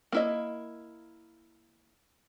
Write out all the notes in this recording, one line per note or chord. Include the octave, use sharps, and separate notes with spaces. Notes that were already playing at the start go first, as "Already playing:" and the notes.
A#3 E4 D#5